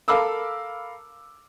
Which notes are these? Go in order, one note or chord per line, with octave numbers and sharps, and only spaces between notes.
A4 A#4 F5 B5 D6 E6